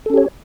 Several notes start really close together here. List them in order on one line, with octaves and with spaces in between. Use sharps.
A4 C#4 G4 C#5